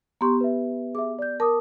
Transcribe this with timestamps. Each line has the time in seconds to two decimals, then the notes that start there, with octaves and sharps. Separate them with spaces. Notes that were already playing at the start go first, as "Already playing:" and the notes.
0.21 B3 G4 A#5 C6 C#6
0.41 B4 E5
0.95 G#4 E5 D6
1.19 D5 G6
1.40 A#4 A5 D6 D#6